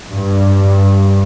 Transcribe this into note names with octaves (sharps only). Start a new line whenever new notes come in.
G2